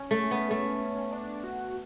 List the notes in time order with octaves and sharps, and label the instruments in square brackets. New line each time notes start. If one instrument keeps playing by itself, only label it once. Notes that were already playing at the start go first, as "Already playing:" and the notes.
Already playing: [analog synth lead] C#4
[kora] A3
B3
A3
[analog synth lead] D4
F#4